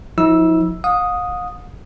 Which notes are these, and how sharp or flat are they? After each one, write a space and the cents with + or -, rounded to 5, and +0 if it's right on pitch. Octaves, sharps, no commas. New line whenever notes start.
F3 +20 E4 -45 E6 +0
F5 +45 D#6 +0